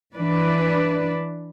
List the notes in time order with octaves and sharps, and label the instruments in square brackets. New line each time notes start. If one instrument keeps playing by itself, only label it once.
[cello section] E3 D4 B4 D5